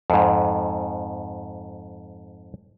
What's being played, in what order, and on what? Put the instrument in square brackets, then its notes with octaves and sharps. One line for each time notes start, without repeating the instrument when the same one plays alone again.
[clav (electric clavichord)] F2 G#2